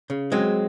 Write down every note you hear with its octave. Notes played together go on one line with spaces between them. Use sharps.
C#3
F#3 G#3 C4